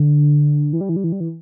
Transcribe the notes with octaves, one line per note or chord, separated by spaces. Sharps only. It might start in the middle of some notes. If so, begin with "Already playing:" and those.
Already playing: D3
E3
G3
E3
G3
E3
G3
E3